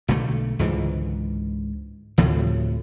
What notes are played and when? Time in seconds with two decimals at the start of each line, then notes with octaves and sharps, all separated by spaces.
0.08 B1 D3 F3 A3
0.59 C#2 G#2 D3 E3
2.18 D2 A2 C3 F3